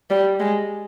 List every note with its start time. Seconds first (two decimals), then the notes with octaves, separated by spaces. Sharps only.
0.10 G3
0.39 G#3